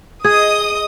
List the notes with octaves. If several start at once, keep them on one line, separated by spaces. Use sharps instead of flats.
G#4 D#5 D#6